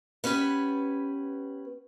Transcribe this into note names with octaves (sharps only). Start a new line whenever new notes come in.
B3 C#4 G4 B4